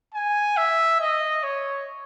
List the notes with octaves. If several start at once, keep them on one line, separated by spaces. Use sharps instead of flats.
G#5
E5
D#5
C#5